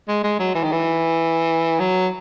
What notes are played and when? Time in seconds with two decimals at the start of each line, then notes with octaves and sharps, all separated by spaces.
0.08 G#3
0.24 G#3
0.39 F#3
0.55 E3
0.63 D#3
0.72 E3
1.80 F#3